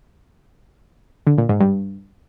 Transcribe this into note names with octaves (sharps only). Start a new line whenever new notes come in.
D3
A#2
G#2
G2